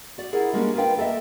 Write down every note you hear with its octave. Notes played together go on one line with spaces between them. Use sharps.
F#4 D5
E4 G#4 A#4 F#5
G3 G#3 A#3 C#4 D4
F4 A#4 B4 C#5 F5 G5
A#3 A4 D#5 E5